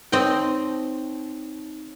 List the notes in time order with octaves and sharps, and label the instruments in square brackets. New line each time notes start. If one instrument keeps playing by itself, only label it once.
[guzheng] C4 D#5 G5 [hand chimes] D#4 C#5